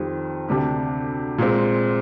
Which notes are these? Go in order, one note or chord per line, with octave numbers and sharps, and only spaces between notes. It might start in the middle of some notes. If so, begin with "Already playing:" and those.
Already playing: F2 D#3 G3 C4
D2 C3 G3 D4 G4
A#2 G#3 C4